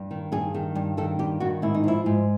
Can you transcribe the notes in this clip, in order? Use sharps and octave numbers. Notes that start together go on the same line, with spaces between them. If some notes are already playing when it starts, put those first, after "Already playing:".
Already playing: G2
D#3
G2 G#4
D#3
G2
D#3 A4
G2 G4
D#3 F#4
G#2 E4
D#4
F3 E4
G#2